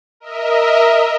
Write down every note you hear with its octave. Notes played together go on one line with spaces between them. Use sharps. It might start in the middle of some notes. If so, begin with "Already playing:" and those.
A#4 D#5 E5